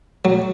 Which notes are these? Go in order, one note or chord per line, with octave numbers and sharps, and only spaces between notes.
F#3